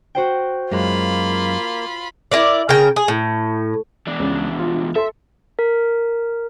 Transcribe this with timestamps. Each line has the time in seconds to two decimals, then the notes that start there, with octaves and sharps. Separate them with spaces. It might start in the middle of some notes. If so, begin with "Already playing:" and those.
0.15 F#4 C5 G5
0.71 F#2 G#3 A#3 F4 B5
2.31 E4 F4 A#4 D5
2.69 C#3 A#4 G5
2.96 G#4
3.08 A2
4.07 E2 D4
4.20 C#2
4.59 F4
4.96 A4 E5 C6
5.59 A#4